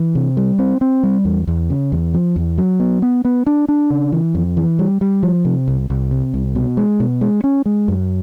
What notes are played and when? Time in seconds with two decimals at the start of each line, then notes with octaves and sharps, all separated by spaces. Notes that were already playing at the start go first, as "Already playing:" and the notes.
Already playing: E3
0.15 C3
0.37 G3
0.59 C4
0.81 C4
1.03 G3
1.25 E2
1.48 E2
1.70 C#3
1.92 E2
2.14 F3
2.36 E2
2.58 F#3
2.80 B3
3.02 B3
3.25 B3
3.46 D4
3.68 D4
3.90 C#3
4.12 E3
4.35 F2
4.57 E3
4.79 G3
5.01 G3
5.23 F3
5.45 C3
5.68 C2
5.90 C2
6.11 C3
6.34 C2
6.55 B2
6.77 G#3
7.00 B2
7.21 G#3
7.44 C#4
7.66 G#3
7.88 F#2